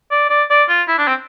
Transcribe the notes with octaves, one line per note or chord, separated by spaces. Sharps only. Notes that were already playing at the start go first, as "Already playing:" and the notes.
D5
D5
D5
F4
E4
D4
C4